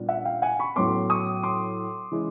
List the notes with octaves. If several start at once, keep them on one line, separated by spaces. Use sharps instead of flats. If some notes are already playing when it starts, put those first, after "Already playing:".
Already playing: A#2 G3 B3 D4
E5 F#5
F5 G5
F#5 G#5
B5 C#6
A2 F#3 B3 C6 D6
C#6 D#6
C6 D6
E3 G#3 C#4 E4